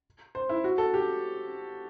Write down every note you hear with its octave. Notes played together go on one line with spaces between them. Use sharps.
C5
E4
F#4
A4
G4